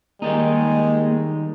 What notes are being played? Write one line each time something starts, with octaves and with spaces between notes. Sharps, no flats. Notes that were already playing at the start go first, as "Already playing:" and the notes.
D#3 G3 G#3 A#3 D#4